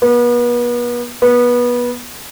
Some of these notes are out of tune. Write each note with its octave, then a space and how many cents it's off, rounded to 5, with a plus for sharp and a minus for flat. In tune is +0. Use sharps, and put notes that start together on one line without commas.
B3 -35
B3 -20